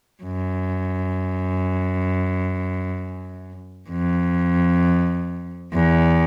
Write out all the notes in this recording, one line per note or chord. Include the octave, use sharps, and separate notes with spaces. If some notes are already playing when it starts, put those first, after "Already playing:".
F#2
F2
E2